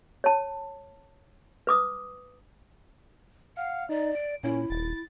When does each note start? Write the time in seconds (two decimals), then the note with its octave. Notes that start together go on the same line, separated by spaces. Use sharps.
0.24 C#5 A5
1.67 B4 D6 D#6
3.57 F5 F#5
3.89 D#4 D5
4.15 D7
4.43 A#2 C#4 E4
4.70 D#1 A6